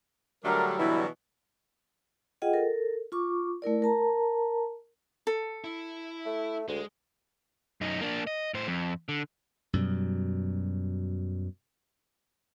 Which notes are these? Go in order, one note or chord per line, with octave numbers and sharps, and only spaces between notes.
D3 F#3 G3 A3 D4 A#4
B2 E3 E4
F4 G#4 D#5 F#5 G5
A4 A#4
F4 C#6 D6
A3 E4 A#4 D5
A#4 A5 A#5
A4
E4
A3
D2 G#3
F#2 D#4
A#3 D4
D#5
A2 C5
F2
D3
F#2 B2 G3